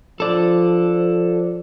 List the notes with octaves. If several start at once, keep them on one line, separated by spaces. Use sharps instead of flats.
F3 A4 D5